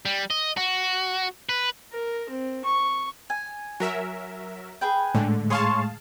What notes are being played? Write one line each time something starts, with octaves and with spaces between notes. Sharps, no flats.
G3
D#5
F#4
B4
A#4
C4
C#6
G#5
F#3 A#4 E5
G#4 B4 G5
A2 D3 G#3 A3
G#4 C#5 F5 A5 C6 C#6